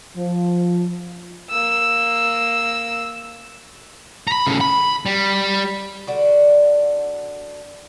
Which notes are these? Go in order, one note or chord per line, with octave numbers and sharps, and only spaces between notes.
F3
A#3 E6
A#5 B5
A2 C#3
B5
G3
D3 D4 F#4